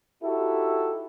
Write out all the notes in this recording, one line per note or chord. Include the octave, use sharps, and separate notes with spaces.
D#4 E4 F#4 G4 A4